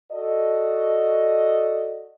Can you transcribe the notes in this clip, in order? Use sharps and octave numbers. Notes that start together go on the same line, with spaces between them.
F#4 A4 D5 D#5